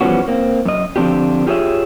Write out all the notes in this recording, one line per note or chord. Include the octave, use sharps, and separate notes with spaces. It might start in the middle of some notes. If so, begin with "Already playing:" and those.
E3 F3 G3 B3 C#4 F#4
A#3 C4
F#2 D#5
D3 F3 C4 D4 F4 G4
F4 G4 G#4 C5 C#5 E5